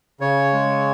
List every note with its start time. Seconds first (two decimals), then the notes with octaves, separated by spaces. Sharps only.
0.20 C#3 C#5
0.53 G#3